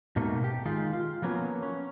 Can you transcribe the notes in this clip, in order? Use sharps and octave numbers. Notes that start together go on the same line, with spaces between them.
G#2 B2 A3 A#3 D#4
G4
D#3 G#3 D#4 F4
F4
F3 F#3 A#3 B3 C#4
C#4